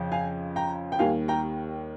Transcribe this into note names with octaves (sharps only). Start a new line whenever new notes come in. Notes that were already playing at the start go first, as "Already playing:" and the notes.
Already playing: F2 C#3 F3
F5 G#5
G5 A#5
G5
D#2 D#3 G3 F5 G#5
G5 A#5